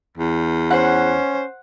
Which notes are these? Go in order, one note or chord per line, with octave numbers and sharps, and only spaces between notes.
E2
C#4 C5 F#5